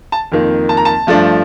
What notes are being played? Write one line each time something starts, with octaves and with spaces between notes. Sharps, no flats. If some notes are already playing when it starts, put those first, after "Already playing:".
A5
F2 D#3 A#3
A5
A#5
A5
G2 F3 A3 D4